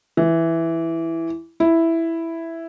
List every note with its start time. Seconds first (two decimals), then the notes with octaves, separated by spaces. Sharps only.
0.17 E3
1.60 E4